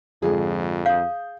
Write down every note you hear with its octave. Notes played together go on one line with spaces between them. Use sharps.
F2 G#2 D3 F3 G#4
F5 D#6 G6